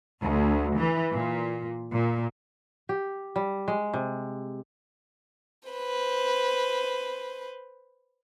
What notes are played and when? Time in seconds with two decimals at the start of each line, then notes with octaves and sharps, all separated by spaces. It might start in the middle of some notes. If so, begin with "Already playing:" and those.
0.21 D2
0.76 E3
1.13 A#2
1.92 A#2
2.89 G4
3.36 G3
3.68 G#3
3.94 C3
5.69 B4 C5